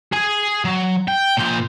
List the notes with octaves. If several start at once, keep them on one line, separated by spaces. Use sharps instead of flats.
G#4 G#5
F#3
G5
A#2 C5